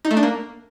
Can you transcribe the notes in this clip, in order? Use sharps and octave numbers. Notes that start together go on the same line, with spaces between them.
D#4
A3
D4
A#3